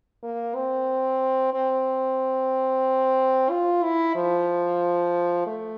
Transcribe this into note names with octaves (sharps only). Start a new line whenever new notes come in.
A#3
C4
C4
F4
E4
F3
A3